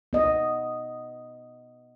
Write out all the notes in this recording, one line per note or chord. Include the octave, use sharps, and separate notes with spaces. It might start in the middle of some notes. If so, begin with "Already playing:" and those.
B3 D#5